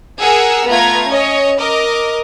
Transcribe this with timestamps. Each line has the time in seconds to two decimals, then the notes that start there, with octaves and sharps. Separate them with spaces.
0.20 G#4 A#4 F#5 E6
0.68 A3 B3 F4 A#5 G#6
1.08 C#4 C#5 D#5
1.59 A#4 D#5 D6